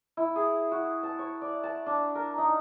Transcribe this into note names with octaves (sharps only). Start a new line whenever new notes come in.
E4
G#4
F#4
A5
C#5
D5
A5
D4
A#4
D#4